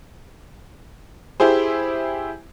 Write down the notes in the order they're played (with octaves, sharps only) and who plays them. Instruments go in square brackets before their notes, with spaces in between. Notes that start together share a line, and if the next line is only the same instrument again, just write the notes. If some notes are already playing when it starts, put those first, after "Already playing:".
[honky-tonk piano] E4 G4 G#4 C5